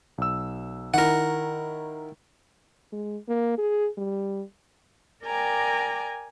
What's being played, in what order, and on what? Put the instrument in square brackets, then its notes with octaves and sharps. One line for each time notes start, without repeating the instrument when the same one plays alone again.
[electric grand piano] B1 E6
[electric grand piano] D#3 E4 [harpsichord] A#4 F#5
[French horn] G#3
A#3
G#4
G3
[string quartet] A#4 D5 G5 G#5 A#5 D6